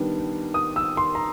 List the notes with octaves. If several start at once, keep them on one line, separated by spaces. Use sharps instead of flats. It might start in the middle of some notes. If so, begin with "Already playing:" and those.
Already playing: D#3 G3 B3 D4
D#6
E6
C6
A#5